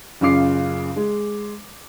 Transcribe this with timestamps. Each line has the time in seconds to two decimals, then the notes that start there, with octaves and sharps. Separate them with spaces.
0.21 F#1 C#3 F4 D6 C7
0.96 G#3